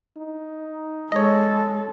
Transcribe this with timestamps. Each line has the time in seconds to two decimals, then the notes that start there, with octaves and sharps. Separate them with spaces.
0.17 D#4
1.12 G#3 A4 C#5 D#5